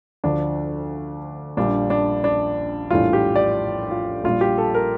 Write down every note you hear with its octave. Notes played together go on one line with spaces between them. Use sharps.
D2 D3 F3 D4
A#1 A#2 G3 D4
D4
D4
A#1 A2 E3 G3 F4
G4
D5
F4
A#1 A#2 G3 F4
G4
A4
A#4